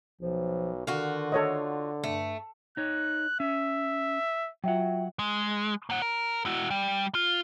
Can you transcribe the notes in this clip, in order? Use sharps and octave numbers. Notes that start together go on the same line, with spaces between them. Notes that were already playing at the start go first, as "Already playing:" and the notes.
B1 F3
D3 D#3 F4 F#4
A4 C#5 D#5
G2 A3
D#4 C#5 F#6
C#4 E5
F#3 F4 E5 F#5 G5
G#3
A#3 F#5
A#4
E4 F#4
G3
F4